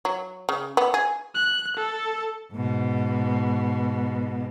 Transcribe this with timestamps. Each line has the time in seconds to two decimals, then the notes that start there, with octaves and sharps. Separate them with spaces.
0.05 F#3
0.49 C#3
0.77 B3
0.94 G#4
1.35 F#6
1.77 A4
2.53 G#2 B2